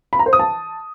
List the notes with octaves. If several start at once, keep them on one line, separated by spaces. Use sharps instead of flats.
B5
A#5
C5
D#6
A5